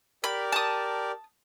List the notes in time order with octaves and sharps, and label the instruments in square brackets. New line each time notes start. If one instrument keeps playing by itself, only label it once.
[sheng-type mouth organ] G4 A#4 D5 [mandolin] B5
[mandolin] A5 D#6